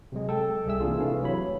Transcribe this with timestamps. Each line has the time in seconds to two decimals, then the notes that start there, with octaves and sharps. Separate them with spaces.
0.12 C3 F#3 G#3
0.29 A4 G5
0.65 C2 G3 G#4 E5 E6
0.80 C3 E3 A#3 D4 F4 G#4
0.98 C3 E3 A3 D4 F5
1.22 F#3 E4 C#5 B5